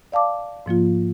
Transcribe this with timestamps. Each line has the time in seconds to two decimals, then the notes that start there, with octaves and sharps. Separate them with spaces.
0.12 D5 F5 A5 D6
0.66 G#2 F3 A#3 F4